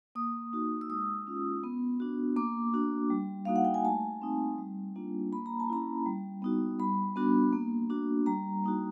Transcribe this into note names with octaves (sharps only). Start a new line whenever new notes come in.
A#3 D#6
D#4 F#4
E6
G#3 D#6
C#4 F4
B3
D4 F#4
A#3 D6
D4 F#4
G3
A#3 D#4 F#4 F5
F#5
G5
G#5
A3 A5
C4 D#4
G3
A#3 D4 F4
A#3 B5
A#5
A5
C#4 E4 A#5
G3
B3 D#4 F#4
G3 B5
B3 D4 F#4
A#3
D4 F#4
G3 A#5
A#3 D#4 F#4